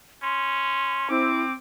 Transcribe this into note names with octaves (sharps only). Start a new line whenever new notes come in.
C#4 C6
C4 E4 D6